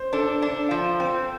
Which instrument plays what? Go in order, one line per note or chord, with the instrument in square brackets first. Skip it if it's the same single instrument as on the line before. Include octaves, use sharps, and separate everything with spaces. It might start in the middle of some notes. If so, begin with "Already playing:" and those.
Already playing: [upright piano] C5
[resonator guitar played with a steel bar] D4 [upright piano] A4
[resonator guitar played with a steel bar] D4
F3
C4